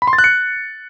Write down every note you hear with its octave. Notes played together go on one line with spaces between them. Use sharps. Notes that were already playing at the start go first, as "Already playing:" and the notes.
B5
C6
A6
F#6
C#7